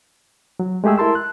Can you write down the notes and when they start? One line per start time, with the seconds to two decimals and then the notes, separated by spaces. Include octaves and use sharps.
0.60 F#3
0.84 G#3 A3 G4 G#4 E6
0.98 E4 A#4 A5 C6 E6
1.15 F#6